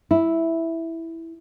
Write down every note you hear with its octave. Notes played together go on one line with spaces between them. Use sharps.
E4